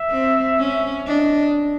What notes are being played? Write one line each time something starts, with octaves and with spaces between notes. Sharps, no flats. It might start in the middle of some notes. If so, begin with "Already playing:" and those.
Already playing: E5
C4
C#4
D4 D#5